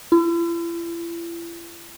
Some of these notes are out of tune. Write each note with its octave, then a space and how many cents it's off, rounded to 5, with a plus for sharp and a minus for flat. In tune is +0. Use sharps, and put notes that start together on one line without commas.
E4 +45